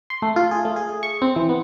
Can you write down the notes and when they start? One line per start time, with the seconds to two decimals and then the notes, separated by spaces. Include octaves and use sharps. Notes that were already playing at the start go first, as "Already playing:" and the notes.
0.10 C6
0.22 A3
0.36 F4
0.51 G#4
0.65 A3
0.76 G#4
1.03 C#6
1.22 C4
1.36 E3
1.49 B3